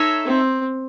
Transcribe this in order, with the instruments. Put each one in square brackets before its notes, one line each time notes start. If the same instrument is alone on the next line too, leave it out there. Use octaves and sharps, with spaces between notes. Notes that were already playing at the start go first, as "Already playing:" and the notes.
Already playing: [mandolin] D#4 A4 C#5 E5
[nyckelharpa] C4